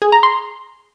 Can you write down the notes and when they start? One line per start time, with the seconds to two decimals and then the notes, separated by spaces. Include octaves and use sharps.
0.02 G#4
0.12 A#5
0.23 C6